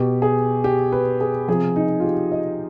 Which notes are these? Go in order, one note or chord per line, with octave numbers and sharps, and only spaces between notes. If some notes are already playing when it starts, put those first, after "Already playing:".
Already playing: B2 G4
G#4
G4
B4
G#4
C3 F3 G#4
D#4
F4
G4
D#5